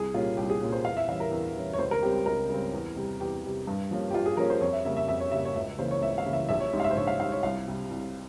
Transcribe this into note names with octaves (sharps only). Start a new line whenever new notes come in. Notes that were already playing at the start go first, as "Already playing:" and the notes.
Already playing: C2 G#4
A#2 G3 A#3 C#4 F4
C2 G4
G#4
A#2 G3 A#3 C#4
C5
E2 F5
E5
E3 G3 C#4 F5
A#4
E2
E3 G3 C#4
C#5
C#2 C5
A#4
C#3 G3 C4 G4
G4
C#2 A#4
C#3 G3 C4
E2
C3 G3
E2 G4
C3 G3
G2
F3 A#3 C#4
G4
G2 F4
G#4
F3 A#3 C#4 A#4
C5
F2 C#5
E5
C#3 G3 A#3 E5
E5
F2 E5
C#5
C#3 G3 A#3 E5
C#5
C#2 E5
C#3 E3 A#3 C#4 C5
C#5
C#2 E5
F5
C#3 E3 A#3 C#4
E5
A#1 E5
C#5
G#2 G3 C#4
F5
E5
C5
A#1 C#5
F5
G#2 G3 C#4 F5
C#5
C2 F5
C3 G3
C2